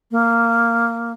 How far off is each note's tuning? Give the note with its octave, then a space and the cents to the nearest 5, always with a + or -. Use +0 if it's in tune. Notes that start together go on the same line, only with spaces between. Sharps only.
A#3 -10